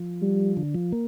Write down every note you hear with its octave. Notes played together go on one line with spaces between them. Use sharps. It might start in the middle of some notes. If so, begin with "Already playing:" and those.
Already playing: F3
G3
D3
F3
A#3